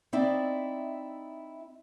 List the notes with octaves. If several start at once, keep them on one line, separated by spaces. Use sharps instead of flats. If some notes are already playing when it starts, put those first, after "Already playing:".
C4 D#4 E4 D5 E5